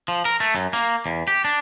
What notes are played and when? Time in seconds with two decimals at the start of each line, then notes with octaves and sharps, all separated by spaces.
0.08 F3
0.25 A#4
0.40 A3
0.55 F#2
0.73 A#3
1.06 E2
1.28 G4
1.45 D4